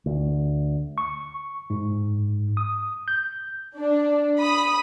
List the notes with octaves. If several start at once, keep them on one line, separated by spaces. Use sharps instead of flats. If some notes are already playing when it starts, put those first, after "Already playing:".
D2
C#6
G#2
D#6
G6
D4
B5 D#6 B6